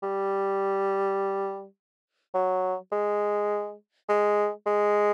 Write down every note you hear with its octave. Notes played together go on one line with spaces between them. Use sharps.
G3
F#3
G#3
G#3
G#3